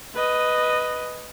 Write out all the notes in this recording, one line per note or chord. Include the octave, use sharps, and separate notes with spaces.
B4 D#5